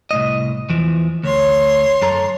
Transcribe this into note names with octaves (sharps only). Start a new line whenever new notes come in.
C2 A2 D#5
E2 E3 F3
D2 C#5 C6
F#2 A4 A#5